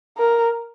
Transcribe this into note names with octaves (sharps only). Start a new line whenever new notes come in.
A#4